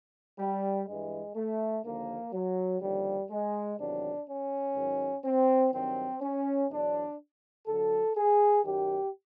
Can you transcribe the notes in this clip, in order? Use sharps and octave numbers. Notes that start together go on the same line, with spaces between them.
G3
G2 E3 G#3
A3
D#2 D3 F3 A#3
F#3
D#2 D3 F3 G3
G#3
E2 C3 D#3 F#3 D4
C#4
G#2 D#3 F#3
C4
G2 D#3 F#3 C4
C#4
E2 B2 F#3 D4
D2 D3 F#3 A4
G#4
F#2 D#3 F#3 G4